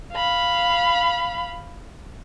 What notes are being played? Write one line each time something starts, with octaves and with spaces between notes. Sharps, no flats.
F5 B5